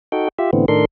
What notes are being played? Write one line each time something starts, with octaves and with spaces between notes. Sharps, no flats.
D#4 F#4 A4 G5
F4 G4 E5
A2 D3 E3 B3 C4
A2 D#3 D4 A4 A#4 C6